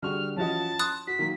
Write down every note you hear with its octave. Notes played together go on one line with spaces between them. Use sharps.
D3 G3 F#4 G#4 C#6 F6
E3 F3 C#4 F#4 D#5 A5
C6 D#6 F#6 A6
F#4 B6
D#3 F#3 A#3